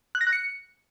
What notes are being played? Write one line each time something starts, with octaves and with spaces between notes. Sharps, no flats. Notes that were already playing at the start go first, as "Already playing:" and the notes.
F#6
A#6
F#6
C#7